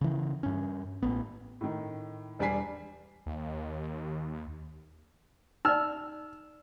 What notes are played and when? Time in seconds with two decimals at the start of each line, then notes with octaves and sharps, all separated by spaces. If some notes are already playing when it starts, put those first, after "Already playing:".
0.01 C#3 E3
0.43 G2 C#4
1.02 A1 B3
1.61 A2 D#3
2.39 E1 G3 D4 G#5 B6 C7
3.26 D#2
5.65 D#4 D5 E6 F6